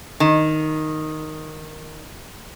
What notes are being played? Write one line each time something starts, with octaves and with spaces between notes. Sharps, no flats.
D#3